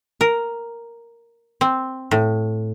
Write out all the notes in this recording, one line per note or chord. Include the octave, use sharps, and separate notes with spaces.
A#4
C4
A2